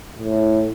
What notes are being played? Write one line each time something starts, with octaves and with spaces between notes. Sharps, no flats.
A2